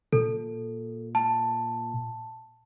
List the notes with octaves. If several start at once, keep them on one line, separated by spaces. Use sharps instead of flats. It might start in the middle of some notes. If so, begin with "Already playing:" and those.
A#2 A4
A5